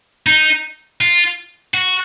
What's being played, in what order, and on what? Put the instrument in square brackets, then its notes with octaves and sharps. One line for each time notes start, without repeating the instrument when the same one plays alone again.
[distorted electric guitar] D#4
F4
F#4